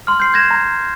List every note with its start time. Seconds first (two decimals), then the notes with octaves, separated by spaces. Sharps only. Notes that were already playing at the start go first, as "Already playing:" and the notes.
0.07 C6 F6
0.20 G6 C7
0.33 G6 G#6 A#6 E7
0.51 A#5